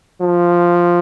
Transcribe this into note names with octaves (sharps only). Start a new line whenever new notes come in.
F3